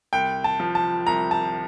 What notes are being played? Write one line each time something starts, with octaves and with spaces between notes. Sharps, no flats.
C2 G5
A5
F3
A5
C2 A#5
A5